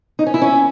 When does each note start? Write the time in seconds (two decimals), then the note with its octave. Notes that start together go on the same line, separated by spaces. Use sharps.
0.19 D#4
0.26 C#4
0.34 E4
0.42 C#4